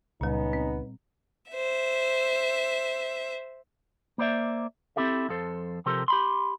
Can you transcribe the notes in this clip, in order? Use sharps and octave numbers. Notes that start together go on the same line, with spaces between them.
C#2 A#2 G3 B3 C#4 D#4
C4
C5 E5
A#3 C5 D5 E5
C4 D4 E4 G4 A4 E5
F2 F3 A4 C5
C3 F3 G4 A4 A#4 C5
G4 B5 C6